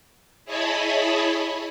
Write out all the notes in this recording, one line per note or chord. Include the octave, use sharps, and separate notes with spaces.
E4 G#4 C#5 D#5 A5 B5